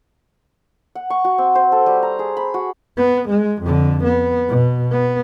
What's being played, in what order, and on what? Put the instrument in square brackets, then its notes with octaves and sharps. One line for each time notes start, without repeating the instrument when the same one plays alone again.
[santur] F#5
C#6
F#4
C4
C5
A4
G3
A#5
G#4
B5
F#4
[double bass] B3
G#3
F2 D3
B3
B2
B3